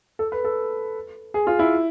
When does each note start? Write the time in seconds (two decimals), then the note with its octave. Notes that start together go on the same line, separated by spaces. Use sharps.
0.19 A4
0.32 B4
0.44 A4
1.34 G#4
1.47 F4
1.59 E4